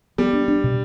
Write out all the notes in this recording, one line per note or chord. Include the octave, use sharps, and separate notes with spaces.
G3 B3
D4
D4
B2